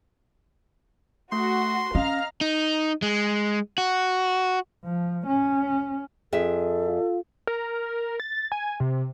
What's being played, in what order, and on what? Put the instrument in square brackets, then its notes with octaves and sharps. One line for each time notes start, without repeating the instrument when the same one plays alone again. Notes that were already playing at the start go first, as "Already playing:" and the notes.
[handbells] A3 [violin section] F#4 [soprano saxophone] C6
[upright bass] C#4 [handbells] D#5 [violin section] F5 A#5 F6
[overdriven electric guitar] D#4
G#3
F#4
[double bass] F3
C#4
[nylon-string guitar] F2 G#4 E5 [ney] A4
[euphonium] F4
[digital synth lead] A#4
A6
G#5
C3